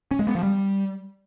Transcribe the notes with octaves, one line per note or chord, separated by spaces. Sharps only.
C#4
G#3
B3
F3
G3